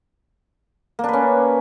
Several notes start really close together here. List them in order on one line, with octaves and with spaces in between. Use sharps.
A#3 D4 B4 C#4